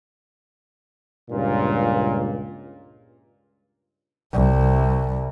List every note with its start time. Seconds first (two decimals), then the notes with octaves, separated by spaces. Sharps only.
1.31 C#2 G2 A#2
4.33 C2